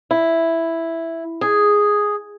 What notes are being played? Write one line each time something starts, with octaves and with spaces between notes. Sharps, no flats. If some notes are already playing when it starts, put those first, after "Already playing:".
E4
G#4